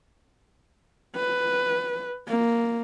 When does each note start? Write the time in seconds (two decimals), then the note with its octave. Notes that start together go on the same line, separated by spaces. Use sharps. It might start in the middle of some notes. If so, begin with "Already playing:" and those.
1.16 B4
2.28 A#3